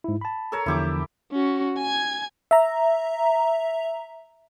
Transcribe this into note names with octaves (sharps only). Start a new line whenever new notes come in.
G#2 E4
A5 B5
A4 A#4 C#5
E2 D3 F3 E4 G4 D6
C#4 F#4
G#5 G#6
E5 A#5